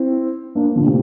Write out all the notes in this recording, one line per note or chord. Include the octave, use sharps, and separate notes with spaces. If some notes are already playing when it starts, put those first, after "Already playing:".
Already playing: C4 E4
A#3 D4
A#2 D3
A2 C3